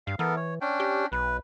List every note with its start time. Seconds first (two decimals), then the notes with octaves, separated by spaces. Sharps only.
0.07 G2 F5
0.19 E3 B3 A4 A#4
0.36 C#5
0.61 C#4 D4 G5
0.80 G4
1.12 B1 B4